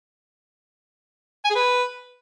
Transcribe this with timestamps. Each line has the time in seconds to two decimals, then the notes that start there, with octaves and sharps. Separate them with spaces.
1.45 G#5
1.50 G#4
1.55 B4